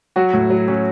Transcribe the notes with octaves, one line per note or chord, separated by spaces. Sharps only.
F#3 F#4
A2
F#3
F#3 C#4